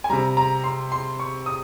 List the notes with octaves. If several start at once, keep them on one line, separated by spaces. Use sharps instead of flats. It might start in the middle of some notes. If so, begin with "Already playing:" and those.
G#5
C3 G3 A#5
A#5
C6
C6
C#6
D#6